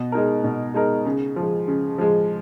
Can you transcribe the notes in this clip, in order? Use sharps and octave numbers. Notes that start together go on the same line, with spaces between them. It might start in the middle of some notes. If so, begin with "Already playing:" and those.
Already playing: B2
G#3 D#4 A#4
B2
G#3 D#4 A#4
C#3
F3 G#3
C#3
F3 G#3